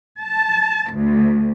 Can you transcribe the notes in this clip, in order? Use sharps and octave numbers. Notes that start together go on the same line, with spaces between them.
A5
D2